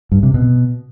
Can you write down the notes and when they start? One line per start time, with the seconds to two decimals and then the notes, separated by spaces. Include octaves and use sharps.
0.12 G2
0.23 C3
0.34 B2